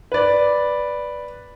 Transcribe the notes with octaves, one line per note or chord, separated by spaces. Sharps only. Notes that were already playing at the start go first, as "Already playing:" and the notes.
B4 D5